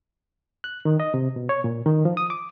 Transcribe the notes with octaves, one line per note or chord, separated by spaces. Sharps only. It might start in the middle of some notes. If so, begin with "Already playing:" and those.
F#6
D#3
D#5
C3
B2
C#5
A#2
D#3
F3
D#6
D6